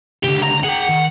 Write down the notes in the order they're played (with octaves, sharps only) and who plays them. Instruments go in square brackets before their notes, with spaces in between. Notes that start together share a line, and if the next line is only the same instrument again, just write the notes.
[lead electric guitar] C#2 D3 [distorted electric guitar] G4
[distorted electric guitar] A#5
[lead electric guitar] G#4 G5 [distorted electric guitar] F#5
[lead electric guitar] D#3